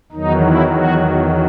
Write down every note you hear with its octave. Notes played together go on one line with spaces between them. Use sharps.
E2 D#3 F#3 D#4
E4
F#4